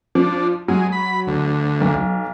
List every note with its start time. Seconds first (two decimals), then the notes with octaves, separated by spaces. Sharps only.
0.15 F3 D4
0.68 F#3 G#3
0.92 B5
1.27 D2
1.81 B1